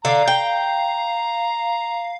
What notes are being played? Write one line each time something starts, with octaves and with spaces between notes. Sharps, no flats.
D3 F5 A#5
G5